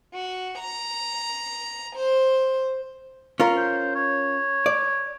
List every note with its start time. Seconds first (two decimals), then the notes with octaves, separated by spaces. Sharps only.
0.14 F#4
0.58 A#5
1.96 C5
3.40 C#4 F4 A#4
3.57 C5
3.95 C#5
4.66 D5